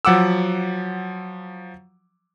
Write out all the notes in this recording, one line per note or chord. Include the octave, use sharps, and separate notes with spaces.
F3 F#3 F#5 D6 E6